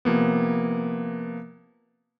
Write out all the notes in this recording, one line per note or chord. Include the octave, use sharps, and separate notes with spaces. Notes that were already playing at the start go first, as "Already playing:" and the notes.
C3 F3 A#3 B3